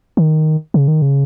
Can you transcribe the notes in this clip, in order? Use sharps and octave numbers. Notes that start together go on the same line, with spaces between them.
D#3
C#3
D#3
C#3